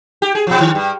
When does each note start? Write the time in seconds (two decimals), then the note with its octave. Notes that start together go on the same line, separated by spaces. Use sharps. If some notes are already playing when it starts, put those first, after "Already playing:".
0.22 G4
0.35 G#4
0.47 B2 F3
0.60 D#3
0.75 G2